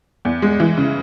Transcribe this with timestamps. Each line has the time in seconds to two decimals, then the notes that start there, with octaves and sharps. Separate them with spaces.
0.25 E2
0.42 G#3
0.60 E3
0.77 C#3